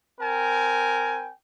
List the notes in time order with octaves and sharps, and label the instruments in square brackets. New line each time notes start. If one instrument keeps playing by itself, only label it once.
[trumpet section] C4 A#4 G5 G#5